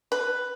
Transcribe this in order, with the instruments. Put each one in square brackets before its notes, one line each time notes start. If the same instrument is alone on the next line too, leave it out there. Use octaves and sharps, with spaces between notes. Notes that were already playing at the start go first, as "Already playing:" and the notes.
[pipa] B4